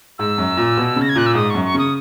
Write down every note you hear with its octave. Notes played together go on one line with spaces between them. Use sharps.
G#2 E6
F#2
A#2
B2
C#3
A#6
G#6
A#2 F#6
E6
G#2 D#6
F#2 C#6
C#6
C#3 D#6